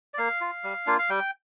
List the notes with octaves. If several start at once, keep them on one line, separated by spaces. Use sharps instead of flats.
D5
A#3 F5
F4
G3
A#3 D4 F4
F5
G3 G5